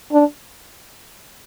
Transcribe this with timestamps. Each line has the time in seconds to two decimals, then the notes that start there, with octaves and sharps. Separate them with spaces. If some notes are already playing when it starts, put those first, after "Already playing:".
0.12 D4